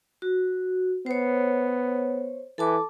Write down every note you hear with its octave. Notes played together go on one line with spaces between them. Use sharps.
F#4
B3 C5 C#5
E3 A4 A5 D6